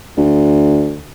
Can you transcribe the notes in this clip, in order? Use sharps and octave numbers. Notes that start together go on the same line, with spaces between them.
D2